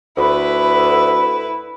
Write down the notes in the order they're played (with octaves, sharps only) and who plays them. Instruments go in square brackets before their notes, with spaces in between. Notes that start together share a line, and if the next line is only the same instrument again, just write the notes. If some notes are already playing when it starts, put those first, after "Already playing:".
[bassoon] D2 [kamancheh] E4 B4